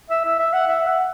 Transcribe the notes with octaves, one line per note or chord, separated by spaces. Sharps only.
E5
E5
E5
F#5
E5
F#5